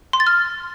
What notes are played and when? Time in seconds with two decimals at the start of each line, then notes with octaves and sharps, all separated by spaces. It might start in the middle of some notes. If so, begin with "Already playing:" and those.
0.13 C6
0.20 A6
0.27 F6